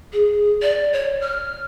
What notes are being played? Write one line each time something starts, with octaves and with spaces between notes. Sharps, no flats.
G#4
D5
C#5
F6